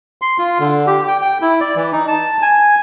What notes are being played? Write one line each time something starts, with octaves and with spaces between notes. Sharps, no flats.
C6
F4
D3
G4
G5
G5
E4
D5
E3
D#4
A5
G#5